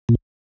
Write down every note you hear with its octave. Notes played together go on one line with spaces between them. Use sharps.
A#2